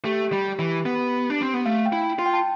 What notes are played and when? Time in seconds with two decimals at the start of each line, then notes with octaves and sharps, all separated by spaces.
0.05 A3 G4
0.32 G3
0.59 E3
0.86 B3
1.30 D4
1.42 C4
1.54 B3
1.66 A3 F5
1.86 G5
1.93 E4
2.19 F4
2.26 G5
2.34 A5